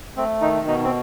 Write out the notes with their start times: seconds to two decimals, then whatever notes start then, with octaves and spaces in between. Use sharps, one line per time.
0.17 A3 C4
0.41 D#3 D#4
0.67 B2 D#4
0.84 C4